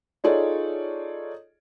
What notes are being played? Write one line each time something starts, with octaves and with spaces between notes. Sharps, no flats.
D#4 F4 G#4 A4 C#5 D5